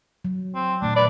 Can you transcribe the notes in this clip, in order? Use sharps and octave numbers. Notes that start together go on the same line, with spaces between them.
F#3
C4
A#2 D#3 A3 D4
B4 D5